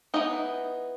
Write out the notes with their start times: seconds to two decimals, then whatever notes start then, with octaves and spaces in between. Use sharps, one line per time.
0.14 E3 B3 D#4 D#5